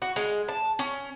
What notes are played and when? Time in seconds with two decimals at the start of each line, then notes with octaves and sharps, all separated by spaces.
0.02 F#4
0.16 G#3
0.48 A5
0.79 C#4